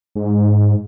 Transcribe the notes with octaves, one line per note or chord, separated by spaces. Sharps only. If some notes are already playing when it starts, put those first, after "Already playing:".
G#2